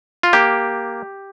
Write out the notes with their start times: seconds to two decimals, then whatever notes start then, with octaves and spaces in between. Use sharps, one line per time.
0.23 F4
0.33 A#3 G4